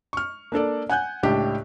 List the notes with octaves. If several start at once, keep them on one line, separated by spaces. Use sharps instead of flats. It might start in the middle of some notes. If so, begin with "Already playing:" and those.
C#6 F6
A#3 D4 A4 D5
F#5 G#5 F#6 G6
C#2 A2 D4 G4 G5